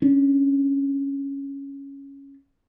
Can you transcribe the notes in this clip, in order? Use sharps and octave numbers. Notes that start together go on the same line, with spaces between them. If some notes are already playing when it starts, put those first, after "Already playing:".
C#4 D4